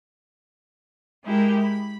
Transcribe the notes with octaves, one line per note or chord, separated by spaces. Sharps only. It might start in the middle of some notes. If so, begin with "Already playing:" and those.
G#3 E4 G4 A#4
B5